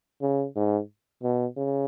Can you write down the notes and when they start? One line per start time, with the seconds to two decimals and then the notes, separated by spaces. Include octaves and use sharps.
0.22 C#3
0.56 G#2
1.23 B2
1.57 C#3